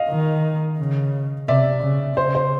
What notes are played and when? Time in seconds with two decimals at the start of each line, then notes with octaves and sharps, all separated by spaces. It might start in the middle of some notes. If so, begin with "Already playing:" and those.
Already playing: D#5 F5
0.09 D#3
0.79 C#3
1.48 C3 D5 E5
1.82 C#3
2.17 C#3 C5
2.35 C5